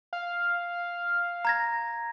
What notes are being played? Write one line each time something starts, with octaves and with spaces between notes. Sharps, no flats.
F5
A#5 G#6 A#6